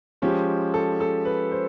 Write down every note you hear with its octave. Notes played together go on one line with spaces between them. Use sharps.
F3 G#3 C#4 G4
A4
A4
B4
C5